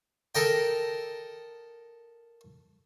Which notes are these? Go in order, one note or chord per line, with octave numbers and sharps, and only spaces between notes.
A4 A#4 D#5 G5